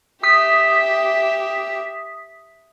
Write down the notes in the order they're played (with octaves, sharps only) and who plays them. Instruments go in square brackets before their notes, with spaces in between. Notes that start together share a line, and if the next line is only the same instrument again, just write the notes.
[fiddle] G4 E5 [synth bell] D#6 B6